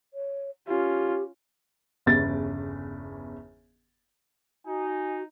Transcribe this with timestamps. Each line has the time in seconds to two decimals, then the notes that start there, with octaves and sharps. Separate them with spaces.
0.13 C#5
0.67 C#4 F4 G4
2.06 G1 E2 C#3 A6
4.66 D#4 F#4 G#5